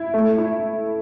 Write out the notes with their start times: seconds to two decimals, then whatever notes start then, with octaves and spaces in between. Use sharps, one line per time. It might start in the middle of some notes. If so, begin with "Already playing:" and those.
Already playing: E4
0.14 A3
0.38 E4